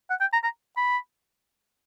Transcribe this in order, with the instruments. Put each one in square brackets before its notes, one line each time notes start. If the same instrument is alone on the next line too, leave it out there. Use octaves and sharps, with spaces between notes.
[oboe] F#5
G5
A#5
A#5
B5